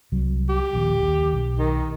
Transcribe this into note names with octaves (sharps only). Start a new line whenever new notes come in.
C2 C3 F#3
G4
D#1 A#1 D#2
D#2
B1
D#3